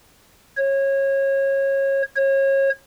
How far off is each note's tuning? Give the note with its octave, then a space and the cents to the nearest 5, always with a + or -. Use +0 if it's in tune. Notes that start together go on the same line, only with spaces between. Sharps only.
C#5 -25
C#5 -30